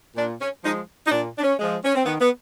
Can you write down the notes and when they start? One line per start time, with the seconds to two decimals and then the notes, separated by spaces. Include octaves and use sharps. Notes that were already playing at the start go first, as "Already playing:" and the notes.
0.16 A#2 D4
0.41 C#4
0.64 F3 G#3 D#4
1.06 D#4
1.11 A#2 D4
1.38 D4
1.43 C#4
1.59 F3 G#3
1.84 C#4
1.95 C4
2.06 D#3 B3
2.20 B3